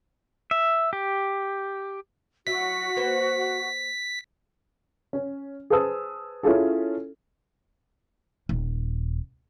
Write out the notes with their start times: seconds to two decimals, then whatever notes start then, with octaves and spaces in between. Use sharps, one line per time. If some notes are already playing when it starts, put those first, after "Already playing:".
0.51 E5
0.93 G4
2.47 F#3 E4 F#4 B6
2.96 A#3 B4 C5
5.13 C#4
5.70 G#4 B4 C5 A5 D#6 E6
6.43 C#4 E4 F4 G#4 A4
8.49 D#1